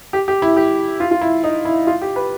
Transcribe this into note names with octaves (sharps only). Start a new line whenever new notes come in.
G4
G4
E4
G4
F4
F4
E4
D#4
E4
F4
G4
B4